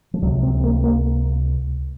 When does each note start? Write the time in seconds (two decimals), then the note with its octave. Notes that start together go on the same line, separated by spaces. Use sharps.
0.14 F3
0.22 C#2 F#3
0.25 C3
0.43 C4
0.57 C4
0.64 A#3
0.84 A#3